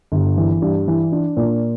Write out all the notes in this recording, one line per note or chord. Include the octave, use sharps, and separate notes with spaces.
G1
E3
G2
E3
D4
A#2